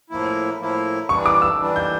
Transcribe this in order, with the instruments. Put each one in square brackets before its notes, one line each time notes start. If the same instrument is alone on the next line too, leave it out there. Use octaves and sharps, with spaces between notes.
[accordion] A2 F3 A#3 E4
A2 F3 A#3 E4
[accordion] E3 G3 D4 [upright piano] C#6
[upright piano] D6
E6
[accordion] E3 G3 D4
[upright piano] G6